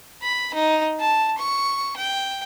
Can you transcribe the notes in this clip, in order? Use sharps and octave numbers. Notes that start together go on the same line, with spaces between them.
B5
D#4
A5
C#6
G5